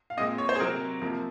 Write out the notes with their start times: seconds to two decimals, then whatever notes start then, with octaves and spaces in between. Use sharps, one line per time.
0.10 F5
0.17 A#2 G#3 C4 D#5
0.38 C#5
0.49 C5
0.55 G#4
0.60 C3 F#3 C4 A#4
1.01 C3 F3 A#3